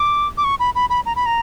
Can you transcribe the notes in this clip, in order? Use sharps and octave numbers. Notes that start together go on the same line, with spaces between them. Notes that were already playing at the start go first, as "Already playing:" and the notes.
Already playing: D6
D6
C#6
B5
B5
B5
A#5
B5
A#5